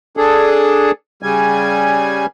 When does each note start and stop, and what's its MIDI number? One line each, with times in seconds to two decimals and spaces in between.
0.17 0.91 62
0.17 0.91 68
0.17 0.91 69
1.23 2.26 49
1.23 2.26 55
1.23 2.26 80